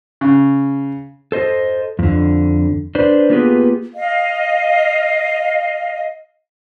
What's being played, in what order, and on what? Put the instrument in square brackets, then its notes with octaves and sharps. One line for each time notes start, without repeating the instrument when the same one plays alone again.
[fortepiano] C#3
[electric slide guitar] A4 C5 D#5
F2 D3
D4 B4 C5 D5
A#3 B3 F4 G4 G#4 B4
[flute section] D#5 F5